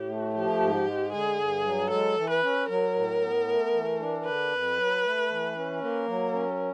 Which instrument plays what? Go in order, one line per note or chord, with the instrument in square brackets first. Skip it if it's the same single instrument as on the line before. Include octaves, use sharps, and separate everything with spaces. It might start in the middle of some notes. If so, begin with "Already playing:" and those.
Already playing: [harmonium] A2 [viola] G4
[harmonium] A3
[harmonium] F3 [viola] G4
[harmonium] G#2
G#3
[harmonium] D3 [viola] G#4
[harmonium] G2
F#3
[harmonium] G#3 [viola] A4
[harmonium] E3
[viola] B4
[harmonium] C#4
[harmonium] F#3 [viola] A#4
[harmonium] A2
B3
A3
E3
D4
[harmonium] D3 [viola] B4
[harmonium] F2
F#3
A3
E3
C#4
[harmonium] A#3 [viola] A#4
[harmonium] F#3
C#4